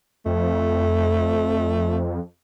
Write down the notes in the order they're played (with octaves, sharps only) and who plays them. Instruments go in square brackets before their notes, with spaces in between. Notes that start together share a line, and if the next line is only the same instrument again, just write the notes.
[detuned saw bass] F2 [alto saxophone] A3